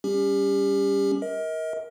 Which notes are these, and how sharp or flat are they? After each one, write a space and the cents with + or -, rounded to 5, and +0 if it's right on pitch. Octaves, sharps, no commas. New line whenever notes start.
G3 +0 C#4 +20 G4 +30
A#4 +15 D#5 +40